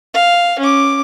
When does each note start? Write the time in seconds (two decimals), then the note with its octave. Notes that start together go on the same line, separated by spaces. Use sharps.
0.14 F5
0.59 C#4 D6